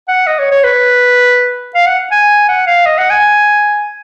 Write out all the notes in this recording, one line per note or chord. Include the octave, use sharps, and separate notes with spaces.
F#5
D#5
C#5
C#5
B4
F5
F#5
G#5
F#5
F5
D#5
F#5
G#5